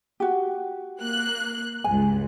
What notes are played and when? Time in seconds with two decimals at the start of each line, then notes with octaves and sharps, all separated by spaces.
0.20 F#4 G4
1.01 A#3 F#6
1.84 C#2 G2 G#5